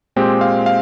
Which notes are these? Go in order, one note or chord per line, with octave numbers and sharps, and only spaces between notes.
A#2 G#3 C4 G4
F5
F5